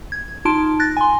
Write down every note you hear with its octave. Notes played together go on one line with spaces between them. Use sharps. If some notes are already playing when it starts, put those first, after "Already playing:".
G#6
D#4 F4 A5 C6 D7
F#6 A6 A#6
G#5 C6